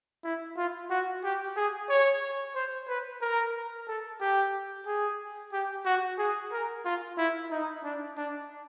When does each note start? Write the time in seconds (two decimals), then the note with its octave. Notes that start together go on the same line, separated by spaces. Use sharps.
0.24 E4
0.57 F4
0.90 F#4
1.24 G4
1.57 G#4
1.90 C#5
2.55 C5
2.88 B4
3.21 A#4
3.87 A4
4.21 G4
4.86 G#4
5.53 G4
5.86 F#4
6.19 G#4
6.52 A#4
6.85 F4
7.18 E4
7.51 D#4
7.84 D4
8.17 D4